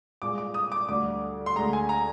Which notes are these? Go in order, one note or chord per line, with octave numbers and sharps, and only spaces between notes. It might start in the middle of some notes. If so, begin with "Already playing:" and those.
C2 A#2 G#3 D6
D6
D#6
D6
D2 D3 G3 D6
C6
D2 D3 G#3 A#5
G#5
A#5